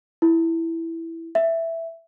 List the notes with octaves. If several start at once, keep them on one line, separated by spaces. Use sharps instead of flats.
E4
E5